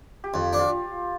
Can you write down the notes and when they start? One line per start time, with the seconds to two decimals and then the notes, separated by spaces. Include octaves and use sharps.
0.24 G4
0.33 F2 F4
0.53 D4
0.59 F4